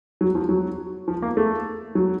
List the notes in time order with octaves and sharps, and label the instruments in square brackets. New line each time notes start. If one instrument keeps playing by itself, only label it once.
[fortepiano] F#3
F3
F#3
F3
A#3
A3
F#3